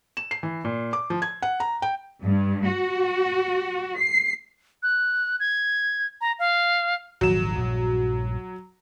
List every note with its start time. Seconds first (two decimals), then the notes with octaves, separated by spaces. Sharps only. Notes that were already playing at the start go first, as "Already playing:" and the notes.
0.17 E7
0.31 C7
0.43 E3
0.65 A#2
0.93 D6
1.10 F3
1.22 G#6
1.42 F#5
1.60 A#5
1.82 G5
2.22 G2
2.66 F#4
3.98 C7
4.83 F#6
5.40 G#6
6.21 A#5
6.39 F5
7.21 D#1 G#1 F3 F#3 E7
7.59 A#1 G2